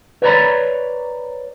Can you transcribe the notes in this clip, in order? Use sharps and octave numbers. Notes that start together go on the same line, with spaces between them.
A#4 B4 C#5 D5 A#5 B5